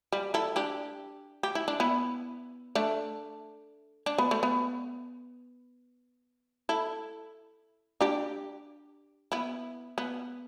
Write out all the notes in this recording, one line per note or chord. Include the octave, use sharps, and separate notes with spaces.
G3
E4 A4
D4 G4
G4
E4
D4
B3 E4
A3 D4
D4
B3
A3
B3
E4 A4
D4 G4
B3 E4
B3